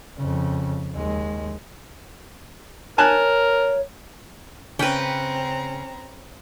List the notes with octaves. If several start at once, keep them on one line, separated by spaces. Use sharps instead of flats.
F2 C#3
D#2 G#3
A#4 C#5 G#5 A5 F#6
C#3 C4 C#4 B4 G5 A#5